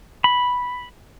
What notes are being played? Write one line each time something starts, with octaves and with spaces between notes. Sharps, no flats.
B5